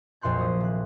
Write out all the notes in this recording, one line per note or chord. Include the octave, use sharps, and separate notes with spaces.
A#1 F2 A#2 C6 F#6 G6
F#3 C6 D#6
D#1 F#6